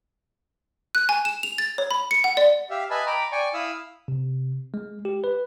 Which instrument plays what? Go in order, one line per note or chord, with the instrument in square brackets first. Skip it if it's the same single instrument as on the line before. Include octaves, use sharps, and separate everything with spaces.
[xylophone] F#6
G#5
E7
F7
A6
C#5
B5
C#7
F#5
D5
[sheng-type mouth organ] G4 E5 F5
B4 D#5 E5 G#5 A5 B5
G5 A#5 B5 D6
D5 G5 G#5 C#6
E4 F5 B5 D#6 E6
[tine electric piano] C3
G#3
G4
B4